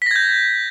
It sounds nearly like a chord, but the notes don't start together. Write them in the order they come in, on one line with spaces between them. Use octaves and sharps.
B6 A#6 G#6 G6